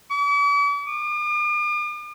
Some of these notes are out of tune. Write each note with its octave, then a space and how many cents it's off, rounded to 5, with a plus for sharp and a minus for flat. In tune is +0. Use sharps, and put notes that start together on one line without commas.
D6 -45
D6 +45